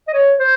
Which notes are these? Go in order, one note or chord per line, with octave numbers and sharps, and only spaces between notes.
D#5
C#5
C5